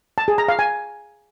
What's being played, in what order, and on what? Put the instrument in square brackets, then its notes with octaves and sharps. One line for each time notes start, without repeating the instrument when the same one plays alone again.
[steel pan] A5
G#4
A#5
F5
G#5